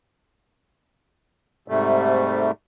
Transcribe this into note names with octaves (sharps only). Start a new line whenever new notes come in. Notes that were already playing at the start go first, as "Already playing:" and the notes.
G#2 C3 G3 A3